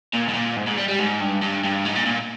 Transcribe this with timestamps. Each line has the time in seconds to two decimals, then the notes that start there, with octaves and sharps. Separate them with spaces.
0.13 A#2
0.28 G#2
0.34 A#2
0.56 G#2
0.67 G#2
0.77 G3
0.88 G3
0.99 G#2
1.20 G2
1.42 G2
1.64 G2
1.85 G#2
1.95 A#2
2.06 A#2